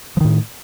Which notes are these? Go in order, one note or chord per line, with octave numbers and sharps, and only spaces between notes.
A2 D#3 F3